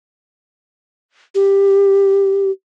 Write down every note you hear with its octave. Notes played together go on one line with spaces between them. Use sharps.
G4